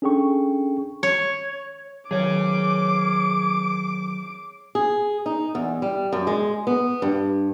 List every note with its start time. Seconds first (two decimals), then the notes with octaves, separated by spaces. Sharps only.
0.02 C#4 D4 G#4 A4 G5 C#6
1.03 C#5
2.11 D#3 F#3 G#4 C#5 D6
4.75 G#4
5.26 D#4
5.55 E2
5.82 G3
6.13 F#2
6.27 G#3
6.67 B3
7.02 G2